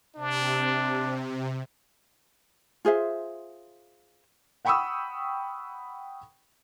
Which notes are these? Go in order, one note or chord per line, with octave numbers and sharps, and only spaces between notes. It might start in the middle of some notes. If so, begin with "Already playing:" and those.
C3 D4
F4 G#4 C5 E5
F#5 G5 B5 C#6 D#6 E6